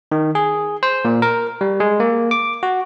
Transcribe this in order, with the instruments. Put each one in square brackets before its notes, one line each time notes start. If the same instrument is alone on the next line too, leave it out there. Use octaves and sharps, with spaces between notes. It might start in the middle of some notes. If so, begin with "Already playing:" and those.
[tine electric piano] D#3
G#4
C5
A#2
A#4
G3
G#3
A#3
D6
F#4